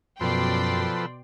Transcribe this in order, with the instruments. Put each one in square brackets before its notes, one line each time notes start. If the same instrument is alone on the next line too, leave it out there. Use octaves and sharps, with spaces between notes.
[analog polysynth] F#2 [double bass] B2 [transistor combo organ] F3 A4 B4 [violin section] D5 G5 C6